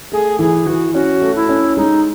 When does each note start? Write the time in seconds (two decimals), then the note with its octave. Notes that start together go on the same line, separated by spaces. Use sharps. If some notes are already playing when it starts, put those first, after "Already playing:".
0.12 A3 G#4
0.39 E3 G#4
0.66 E3 F#4
0.94 C#4 F#4
1.21 A3
1.35 E4
1.49 C#4
1.77 G#3 D#4